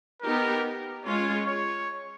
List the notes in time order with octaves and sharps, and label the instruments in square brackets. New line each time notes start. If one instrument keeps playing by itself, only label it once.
[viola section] B3 D#4 G4 [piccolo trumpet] A#4
[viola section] G#3 C#4 F4 [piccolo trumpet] C#5
[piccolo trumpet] C#5